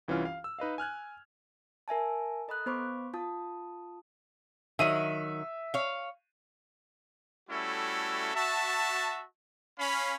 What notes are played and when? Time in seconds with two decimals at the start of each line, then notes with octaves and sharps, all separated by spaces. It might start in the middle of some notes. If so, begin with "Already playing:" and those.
0.08 C2 E3 C#4 F4 F6
0.25 F5
0.44 E6
0.59 D#4 B4 D#5 F5
0.78 G#5 F6 F#6 G#6
1.88 A#4 E5 G#5 A5
2.48 A4 D#5 A#5 B5 D#6 F#6
2.66 B3 C5 B5 C#6 D6
3.14 F4 A5 D#6
4.79 D#3 F#3 E5 D#7
5.74 C#5 F5
7.49 G3 A3 C#4 E4 F#4 A4
8.34 F#4 E5 A5
9.78 C#4 F5 B5